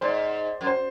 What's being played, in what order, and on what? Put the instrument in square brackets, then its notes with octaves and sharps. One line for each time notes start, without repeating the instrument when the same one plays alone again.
[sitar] G#2 [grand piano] C5 D5
[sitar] F#2
[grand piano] C5